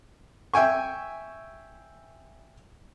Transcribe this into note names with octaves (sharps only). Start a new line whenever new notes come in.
E5 G5 G#5 C#6